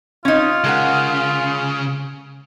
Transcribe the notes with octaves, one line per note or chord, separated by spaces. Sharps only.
C#4 D#4 F4
C#3 G#3 A#4 F#5